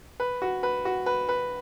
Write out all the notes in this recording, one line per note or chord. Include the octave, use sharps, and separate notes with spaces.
B4
F#4
B4
F#4
B4
B4